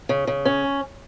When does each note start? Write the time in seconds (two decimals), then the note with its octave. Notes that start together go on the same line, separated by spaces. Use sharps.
0.09 C#3
0.27 C#3
0.45 C#4